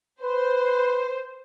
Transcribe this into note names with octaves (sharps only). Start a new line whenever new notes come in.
B4 C5